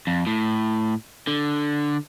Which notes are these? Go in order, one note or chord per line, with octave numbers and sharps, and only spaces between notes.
F2
A2
D3